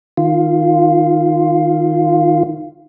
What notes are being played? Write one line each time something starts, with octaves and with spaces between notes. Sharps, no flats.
D#3 F4